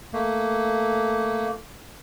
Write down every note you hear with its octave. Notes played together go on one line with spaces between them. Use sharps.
A3 A#3